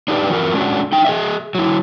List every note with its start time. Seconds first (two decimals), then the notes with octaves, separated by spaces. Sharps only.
0.08 D4 D#4 G4 B4 D5
0.29 E3 F3 F#4 A#4
0.54 G#3 C#4 D4 F4 F#4
0.92 D#4 G5
1.05 G#4 B4 D#5 E5
1.55 F#3 E4